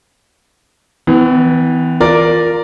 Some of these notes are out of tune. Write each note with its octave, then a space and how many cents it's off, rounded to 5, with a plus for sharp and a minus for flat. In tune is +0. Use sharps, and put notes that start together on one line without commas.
E3 -25 B3 +35
F4 +0 A#4 +0 D5 -5